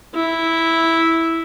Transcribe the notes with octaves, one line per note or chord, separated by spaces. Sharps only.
E4